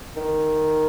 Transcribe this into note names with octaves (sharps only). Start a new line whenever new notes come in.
D#3